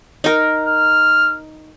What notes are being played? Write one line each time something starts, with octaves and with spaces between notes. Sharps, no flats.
D#4 A#4
F6